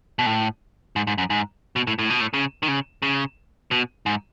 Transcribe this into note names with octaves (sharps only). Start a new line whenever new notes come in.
B2
A2
G#2
G#2
F#2
G#2
B2
A2
A2
B2
A2
C#3
D#3
C#3
C#3
B2
G#2